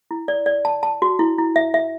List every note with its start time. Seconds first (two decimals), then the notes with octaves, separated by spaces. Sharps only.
0.11 E4
0.28 D5
0.46 D5
0.65 A5
0.83 A5
1.02 F#4
1.19 E4
1.38 E4
1.56 E5
1.74 E5